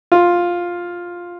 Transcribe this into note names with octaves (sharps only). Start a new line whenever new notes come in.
F4